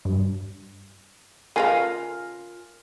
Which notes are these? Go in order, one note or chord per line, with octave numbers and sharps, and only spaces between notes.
G2
C#3 F4 A#4 B4 F5 G#5